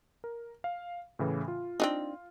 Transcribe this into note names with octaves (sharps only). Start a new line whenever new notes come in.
A#4
F5
A2 C#3 E3
F4
C4 D4 D#4